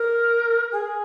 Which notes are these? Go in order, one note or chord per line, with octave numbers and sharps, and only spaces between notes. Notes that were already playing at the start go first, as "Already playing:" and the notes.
Already playing: A#4
G#4